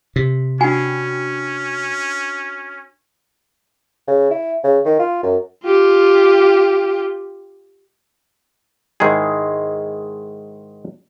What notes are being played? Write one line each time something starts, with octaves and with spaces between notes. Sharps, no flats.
C3
C#4 D4 F#4 G#5
C#3
E4
C#3
D#3
F4
F#2
F4 G4
G#2 D#3 G#3 E4 G#4